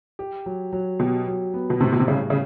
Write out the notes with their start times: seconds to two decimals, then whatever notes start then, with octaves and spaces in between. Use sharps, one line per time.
0.19 G4
0.46 F#3
0.73 F#3
1.00 B2 G4
1.27 F#3
1.54 B3
1.70 B2
1.80 A2 C3
1.92 B2
2.00 C3
2.07 C#3 G3
2.30 C#3